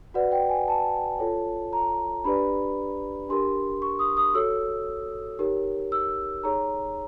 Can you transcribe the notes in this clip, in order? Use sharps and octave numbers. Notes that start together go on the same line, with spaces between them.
F#4 B4 D5 F#5
G5
G#5
A5
F4 A4 C#5
A#5
D4 G4 B4 D5 B5
D4 G4 A#4 C6
C#6
D#6
D#6
F#4 A4 C#5 E6
D#4 G4 A#4 C#5
E6
D#4 G#4 C#5 A#5